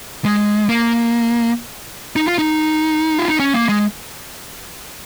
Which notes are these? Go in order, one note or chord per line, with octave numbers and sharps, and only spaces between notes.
G#3
A#3
D#4
F4
D#4
F4
D#4
C#4
A#3
G#3